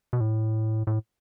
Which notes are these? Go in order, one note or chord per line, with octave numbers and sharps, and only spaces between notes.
B2
A2
A2